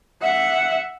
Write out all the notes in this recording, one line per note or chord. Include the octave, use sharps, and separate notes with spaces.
E5 F#5